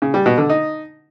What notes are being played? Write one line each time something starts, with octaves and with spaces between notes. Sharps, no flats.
C#3
G3
B2
D3
D#4